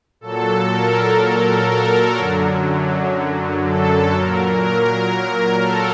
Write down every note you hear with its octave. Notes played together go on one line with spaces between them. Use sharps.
A#2 F#3 A4
A#4
A4
A#4
F#2 D3 F#3
A4
A#2 F#3 A#4
A#4
A4